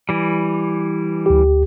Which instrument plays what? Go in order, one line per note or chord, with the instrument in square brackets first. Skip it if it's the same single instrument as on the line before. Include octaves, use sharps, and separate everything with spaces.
[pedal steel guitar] E3 G3
[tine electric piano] D2 G4